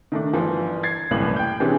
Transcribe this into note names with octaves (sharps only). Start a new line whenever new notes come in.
D#3 A3 D4
G1 E3 F3
G#6 A6 C7
D#1 C2 F#2 A2 E3 F#7
G5 G6
C3 E3 C#4 D4 G4 G#4